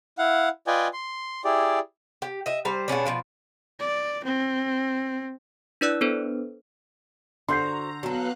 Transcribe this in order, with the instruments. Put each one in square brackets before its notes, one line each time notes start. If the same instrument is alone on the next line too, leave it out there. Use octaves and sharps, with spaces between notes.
[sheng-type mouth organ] E4 F5 F#5
F4 B4 D5 D#5 G5 G#5
C6
E4 G4 G#4 D5
[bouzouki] G4
D#5 E5
G3 C5 A#5
B2 G#3 C#4 D4
B2 F3 D5
[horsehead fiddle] D5
C4
[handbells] D4 E4 B4 D5 E6 F#6
B3 D4 A4 B4 C5
[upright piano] D3 [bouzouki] F#4 C5 [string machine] A#5 [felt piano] C6 G6 C7
[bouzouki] F#3 A4 [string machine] B3 F5 F#6